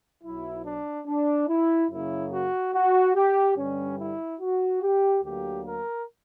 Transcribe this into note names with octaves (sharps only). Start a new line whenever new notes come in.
B1 B2 F#3 E4
D4
D4
E4
F#2 C#3 F#3 A#3 E4
F#4
F#4
G4
G2 D3 G3 C#4
E4
F#4
G4
D2 D3 F#3 A#3 G4
A#4